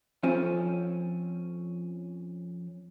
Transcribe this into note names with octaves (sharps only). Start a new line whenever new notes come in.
F2 F3 C4 C#4